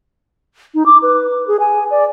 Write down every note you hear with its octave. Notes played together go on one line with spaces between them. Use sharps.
D#4
D6
B4
G#4
G#5
D5